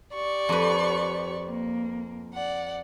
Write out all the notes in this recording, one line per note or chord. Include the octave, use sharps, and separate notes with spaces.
G4 D5 C#6
F2 B4
A#3
D5 F#5